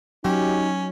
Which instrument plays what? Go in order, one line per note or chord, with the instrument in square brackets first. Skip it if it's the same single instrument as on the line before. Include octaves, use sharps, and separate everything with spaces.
[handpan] F#3 [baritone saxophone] C#4 [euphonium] D#4 [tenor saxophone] G4